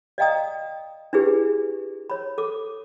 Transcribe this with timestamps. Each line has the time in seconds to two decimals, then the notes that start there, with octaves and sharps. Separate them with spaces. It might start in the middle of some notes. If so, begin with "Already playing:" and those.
0.18 D5 D#5 F5 G5 A#5 D#6
1.13 D4 E4 F4 G4 G#4 B4
2.10 C#5 B5
2.38 A4 D6